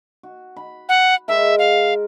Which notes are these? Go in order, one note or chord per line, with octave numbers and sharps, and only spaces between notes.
F#4
B5
F#5
G#3 A#4 E5
F5